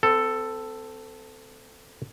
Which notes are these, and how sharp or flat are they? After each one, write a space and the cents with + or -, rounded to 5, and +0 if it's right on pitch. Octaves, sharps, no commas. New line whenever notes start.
C4 -35 A4 +5